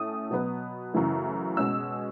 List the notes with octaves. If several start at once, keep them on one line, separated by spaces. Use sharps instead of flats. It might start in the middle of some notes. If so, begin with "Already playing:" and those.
Already playing: A2 A3 C#4 D#6
B2 F#3 B3
F#2 C#3 E3 A3
B2 G#3 C#4 E6